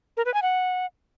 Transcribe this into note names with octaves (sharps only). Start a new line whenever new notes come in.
A#4
B4
G#5
F#5